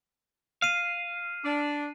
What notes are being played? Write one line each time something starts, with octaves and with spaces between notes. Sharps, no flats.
F5 C7 D#7
D4